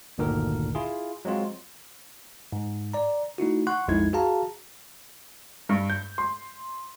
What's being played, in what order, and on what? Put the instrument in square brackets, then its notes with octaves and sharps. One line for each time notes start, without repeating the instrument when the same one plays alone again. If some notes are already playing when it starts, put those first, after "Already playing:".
[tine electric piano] G1 D2 A#2 D3 D#3 A#4
E4 F4 G#4
F#3 G#3 C4 F4 F#4
G#2
D5 A#5
A3 D#4 E4 F#4
F#5 C6 C#6 F#6
B1 F2 G#3 D#4 E4 G#6
F#4 G#4 F5 A5 A#5
[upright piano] G2
G6
C6